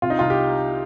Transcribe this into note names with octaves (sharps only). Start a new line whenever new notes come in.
C3 F4
D#4
C2 F4
G4